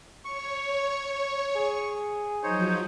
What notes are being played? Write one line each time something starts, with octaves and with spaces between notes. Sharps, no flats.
C#5 C#6
G#4
F3 F#3 D#4 C5 C#5